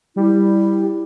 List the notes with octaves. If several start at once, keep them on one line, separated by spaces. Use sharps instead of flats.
G3 E4